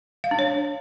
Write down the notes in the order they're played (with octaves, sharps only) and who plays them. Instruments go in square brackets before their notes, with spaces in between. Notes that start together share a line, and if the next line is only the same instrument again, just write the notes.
[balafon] F5
D4
C#5